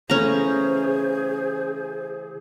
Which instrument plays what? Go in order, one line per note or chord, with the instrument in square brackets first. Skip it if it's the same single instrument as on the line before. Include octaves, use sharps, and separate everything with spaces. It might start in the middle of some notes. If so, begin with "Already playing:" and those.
[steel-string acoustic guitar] C#3 E3 A3 [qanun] C#4 A#5 [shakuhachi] G#4 [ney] C5